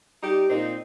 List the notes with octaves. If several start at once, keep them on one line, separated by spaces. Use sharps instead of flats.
G3 D#4 G4
A#2 C4 D#4